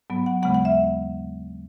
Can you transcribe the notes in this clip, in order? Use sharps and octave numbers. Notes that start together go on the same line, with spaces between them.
G#2 F#3 B3
F#5
D#2 C#3 G#3 B3 F#5
F#5
E5